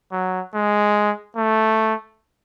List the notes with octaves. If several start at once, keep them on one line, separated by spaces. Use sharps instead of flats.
F#3
G#3
A3